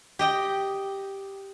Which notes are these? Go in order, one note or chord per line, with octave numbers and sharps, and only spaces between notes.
G4 D#5 G5